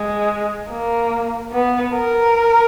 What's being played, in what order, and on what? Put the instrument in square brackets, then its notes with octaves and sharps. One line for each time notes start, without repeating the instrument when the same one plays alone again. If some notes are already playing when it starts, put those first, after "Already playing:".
Already playing: [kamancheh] G#3
A#3
B3
A#4